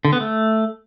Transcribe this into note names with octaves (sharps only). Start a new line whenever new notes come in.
D3
B3
A3